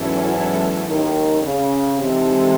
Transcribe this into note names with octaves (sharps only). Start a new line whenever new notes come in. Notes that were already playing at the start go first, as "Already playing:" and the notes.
Already playing: E2 G#2 E3 F#3 C#4 E4 A4
D#2 D#3
C#3
C3 E3 G#3 D#4 A4